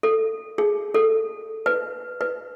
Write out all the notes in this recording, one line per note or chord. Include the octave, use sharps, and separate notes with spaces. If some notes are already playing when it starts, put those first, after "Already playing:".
A4
G#4
A4
B4
B4